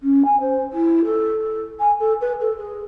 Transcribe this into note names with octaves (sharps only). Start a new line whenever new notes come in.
C#4
G#5
C5
E4
A4
G#5
A4
B4
A4
G#4